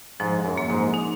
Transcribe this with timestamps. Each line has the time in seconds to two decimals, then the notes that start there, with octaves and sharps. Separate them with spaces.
0.20 G#2 F3
0.45 F#2
0.57 A#3
0.70 G#2
0.94 D#4